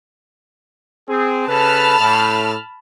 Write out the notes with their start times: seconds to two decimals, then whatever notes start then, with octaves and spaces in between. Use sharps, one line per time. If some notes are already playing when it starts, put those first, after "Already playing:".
1.09 C4 G#4
1.48 C#3 A4 B4 A5 B5 F6
2.00 A2